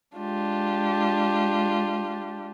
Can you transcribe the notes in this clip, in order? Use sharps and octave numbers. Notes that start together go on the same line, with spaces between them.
G#3 D4 F4 G4